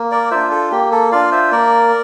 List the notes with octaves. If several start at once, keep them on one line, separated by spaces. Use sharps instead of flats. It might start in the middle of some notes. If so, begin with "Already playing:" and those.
Already playing: A#3
A#4 D5
D4 F4 C5 E5
A4
A#3 G4
A4
D4 F4 D5 F5
C5 E5
A#3 A#4 D5